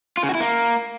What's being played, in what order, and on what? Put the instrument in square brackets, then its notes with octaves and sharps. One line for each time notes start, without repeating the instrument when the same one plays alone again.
[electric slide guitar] F4
C#3
F#4
E4
A#3